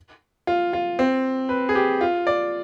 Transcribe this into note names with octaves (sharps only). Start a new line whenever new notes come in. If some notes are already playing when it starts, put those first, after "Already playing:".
F4
F4
C4
B4
G#4
G4
F4
D5